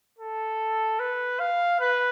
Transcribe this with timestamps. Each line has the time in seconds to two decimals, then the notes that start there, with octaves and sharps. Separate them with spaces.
0.19 A4
0.99 B4
1.39 F5
1.80 B4